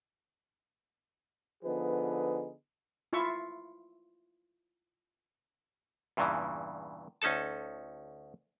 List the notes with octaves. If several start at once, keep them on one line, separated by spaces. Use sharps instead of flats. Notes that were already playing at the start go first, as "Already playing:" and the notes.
D3 F3 B3 D#4 G#4 B4
E4 F4 E5 C#6
E2 G2 A#2 C#3 E3
D2 C#4 D#4 A4 A5